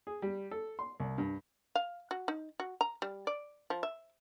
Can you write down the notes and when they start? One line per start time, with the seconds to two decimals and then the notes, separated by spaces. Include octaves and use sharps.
0.07 G#4
0.22 G3
0.51 A4
0.79 C6
1.00 C2
1.18 G2
1.75 F5
2.11 F#4
2.28 D#4
2.60 F#4
2.81 A#5
3.02 G3
3.27 D5
3.70 F3
3.83 E5